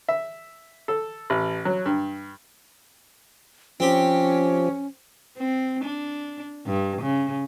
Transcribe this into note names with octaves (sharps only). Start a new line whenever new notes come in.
E5
A4
A1
F#3
G2
F3 C4 C#4 G4
C4
D4
G2
C#3